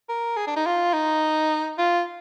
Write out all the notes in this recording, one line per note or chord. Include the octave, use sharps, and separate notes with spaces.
A#4
G#4
D4
D#4
F4
D#4
F4